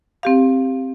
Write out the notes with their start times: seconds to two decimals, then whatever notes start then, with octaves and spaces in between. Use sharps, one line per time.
0.23 C4 G4 F5